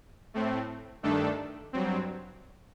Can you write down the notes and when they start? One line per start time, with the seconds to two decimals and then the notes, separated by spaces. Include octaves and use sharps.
0.34 A2 A3 C4
1.03 G2 D#3 A3 D4 A4
1.73 G2 F#3 C4